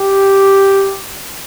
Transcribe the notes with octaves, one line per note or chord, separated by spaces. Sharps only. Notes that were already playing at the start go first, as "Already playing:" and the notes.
Already playing: G4